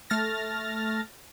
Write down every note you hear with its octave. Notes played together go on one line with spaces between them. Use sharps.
A3 F6 A6 A#6